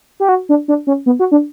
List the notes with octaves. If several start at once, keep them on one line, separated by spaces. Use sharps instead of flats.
G4
F#4
D4
D4
C#4
B3
F#4
D4